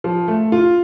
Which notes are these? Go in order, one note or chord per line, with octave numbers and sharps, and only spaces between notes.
F3
A3
F4